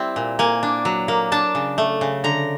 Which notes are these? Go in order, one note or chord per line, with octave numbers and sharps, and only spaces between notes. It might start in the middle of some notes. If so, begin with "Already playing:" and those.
Already playing: G3 C4 E4
A#2
A#3 G#5
D4
F#3
A#3
D4 A5
C#3
A3
C#3
D3 A#5